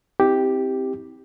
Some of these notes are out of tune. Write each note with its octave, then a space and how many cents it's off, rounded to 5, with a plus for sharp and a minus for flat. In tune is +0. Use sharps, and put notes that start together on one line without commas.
C4 +0 E4 -40 G4 +0